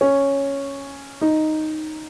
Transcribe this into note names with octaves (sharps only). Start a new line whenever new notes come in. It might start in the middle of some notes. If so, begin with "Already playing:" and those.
C#4
D#4